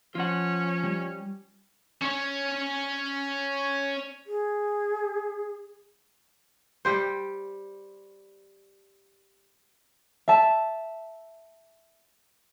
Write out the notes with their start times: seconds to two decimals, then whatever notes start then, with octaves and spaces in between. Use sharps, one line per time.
0.15 F3 C#4 F4 F#5
0.84 G3
2.02 C#4 C#5
4.27 G#4
6.85 G3 G4 C5
10.28 E5 A5